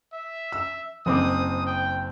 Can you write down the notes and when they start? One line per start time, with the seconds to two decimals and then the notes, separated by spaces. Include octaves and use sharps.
0.13 E5
0.52 E6
1.06 F#1 C4 D6 D#6
1.66 G5